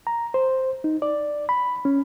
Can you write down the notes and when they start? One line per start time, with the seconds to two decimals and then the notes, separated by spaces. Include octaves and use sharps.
0.07 A#5
0.34 C5
0.84 D#4
1.02 D5
1.49 B5
1.85 C#4